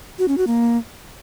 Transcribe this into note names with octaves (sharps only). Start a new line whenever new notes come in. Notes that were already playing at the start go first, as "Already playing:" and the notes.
F#4
C#4
F#4
A#3